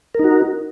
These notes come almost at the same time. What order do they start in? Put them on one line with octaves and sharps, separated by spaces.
A#4 D#4 F#4